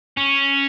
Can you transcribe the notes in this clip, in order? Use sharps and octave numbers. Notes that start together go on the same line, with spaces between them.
C#4